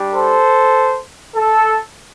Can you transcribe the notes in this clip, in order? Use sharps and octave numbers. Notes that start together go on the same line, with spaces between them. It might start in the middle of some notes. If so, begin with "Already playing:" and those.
Already playing: G3 D4 G4
A4 C5
A4